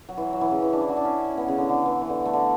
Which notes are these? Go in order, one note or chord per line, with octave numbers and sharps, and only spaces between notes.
F#3
E3
F#3
E3
C#3
E3
D4
E4
F#4
D4
C#4
B3
C#3
D3
D3
E3
E3
D3
A3
D3